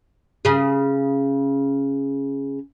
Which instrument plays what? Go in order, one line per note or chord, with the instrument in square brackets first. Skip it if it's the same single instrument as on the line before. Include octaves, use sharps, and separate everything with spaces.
[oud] C#3 G#4